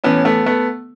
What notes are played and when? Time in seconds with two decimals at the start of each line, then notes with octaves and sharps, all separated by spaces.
0.04 A2 E3 B3 C#4
0.25 A3 B3
0.46 A3 B3